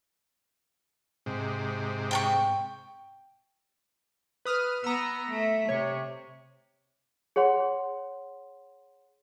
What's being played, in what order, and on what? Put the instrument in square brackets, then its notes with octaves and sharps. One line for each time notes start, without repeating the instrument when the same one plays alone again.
[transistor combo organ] G#2 C3
[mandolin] G5 A5 C#6
[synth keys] B4 D#6 F6
[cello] B3 [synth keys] A#5 E6
[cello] A3 E5
[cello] C3 [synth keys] C#5
[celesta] G#4 C#5 F#5 C6